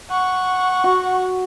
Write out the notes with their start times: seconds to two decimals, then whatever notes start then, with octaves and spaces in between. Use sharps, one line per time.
0.10 F#5 C#6
0.84 F#4